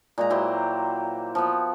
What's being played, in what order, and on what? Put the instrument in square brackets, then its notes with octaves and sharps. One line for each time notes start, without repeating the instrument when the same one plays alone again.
[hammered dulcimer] A#2 G#3 A#5
F#3 E4 G4 C5
F3 B3